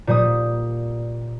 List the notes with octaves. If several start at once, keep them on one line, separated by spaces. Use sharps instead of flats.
A#2 G3 D#6